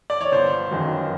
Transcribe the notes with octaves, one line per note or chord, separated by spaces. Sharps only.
D5
C#5
G1 C5
F#2 D#3 F#3